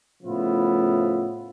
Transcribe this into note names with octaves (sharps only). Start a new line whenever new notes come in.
A2 C#3 F3 B3 E4 F4